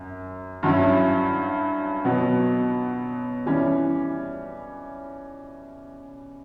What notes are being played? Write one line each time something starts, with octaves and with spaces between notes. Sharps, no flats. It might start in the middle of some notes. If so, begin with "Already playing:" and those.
Already playing: F#2
G2 F#3 C#4 E4
B2 F#3 B3
E3 G3 C#4